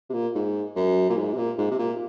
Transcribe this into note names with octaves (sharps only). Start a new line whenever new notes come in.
C3
A#2
G#2
F#2
A#2
G#2
C3
A#2
G#2
C3
A#2